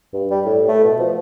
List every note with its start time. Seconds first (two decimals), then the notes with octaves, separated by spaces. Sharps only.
0.13 G2
0.30 G3
0.45 A2
0.68 A3
0.84 B2
0.99 F3